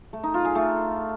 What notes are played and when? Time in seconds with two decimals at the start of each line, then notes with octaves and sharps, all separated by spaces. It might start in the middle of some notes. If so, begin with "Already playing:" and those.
0.13 A3
0.23 D#4
0.34 F4
0.45 G#4
0.55 A3